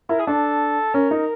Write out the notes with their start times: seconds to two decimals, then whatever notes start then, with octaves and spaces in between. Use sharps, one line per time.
0.09 E4 A#4
0.19 G#4
0.27 D4 A4
0.94 C#4 A#4
1.11 D#4